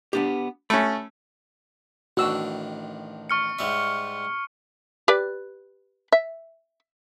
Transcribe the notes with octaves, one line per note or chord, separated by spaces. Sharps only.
B3 D4 G4
A3 C#4 B5
A1 D#3 D4 F#4 E6
C#6 F6 C#7
G#2 G3 E5
G4 B4 D5
E5